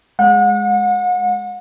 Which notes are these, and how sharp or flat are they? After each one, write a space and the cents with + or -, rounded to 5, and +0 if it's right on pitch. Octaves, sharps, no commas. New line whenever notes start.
G#3 +0 F#5 -35